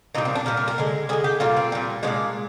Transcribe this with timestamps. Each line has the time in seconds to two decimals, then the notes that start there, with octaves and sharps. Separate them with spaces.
0.15 A#2 D#4
0.18 G3
0.25 C4
0.35 D4
0.46 A#2 G3 A#4
0.57 A#4
0.68 A#4
0.78 D3 G#3
1.09 D3 G#4
1.13 G#3
1.24 G4
1.40 A#2 G3 F4
1.56 C4
1.72 A#2 G3
2.03 F3 G#3 D4
2.07 A#2